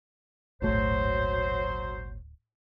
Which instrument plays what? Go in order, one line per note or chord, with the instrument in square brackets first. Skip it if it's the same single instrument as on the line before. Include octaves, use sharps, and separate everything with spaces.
[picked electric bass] D1 A3 [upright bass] G#1 A#2 [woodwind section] F#3 C5